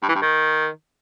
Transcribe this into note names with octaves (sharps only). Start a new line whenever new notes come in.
G2
E3
G2
D#3